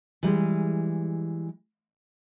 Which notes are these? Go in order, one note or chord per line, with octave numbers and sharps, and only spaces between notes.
E3 G3 G#3